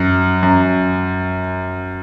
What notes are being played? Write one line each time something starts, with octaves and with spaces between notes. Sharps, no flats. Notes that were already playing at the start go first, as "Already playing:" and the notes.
Already playing: F#2
F#2